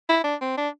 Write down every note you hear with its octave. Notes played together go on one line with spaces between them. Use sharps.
E4
D4
C4
D4